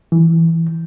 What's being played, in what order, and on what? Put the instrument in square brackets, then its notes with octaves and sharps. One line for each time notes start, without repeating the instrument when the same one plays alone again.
[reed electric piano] E3